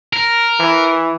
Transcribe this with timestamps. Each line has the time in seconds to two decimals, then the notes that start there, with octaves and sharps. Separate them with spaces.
0.13 A#4
0.60 E3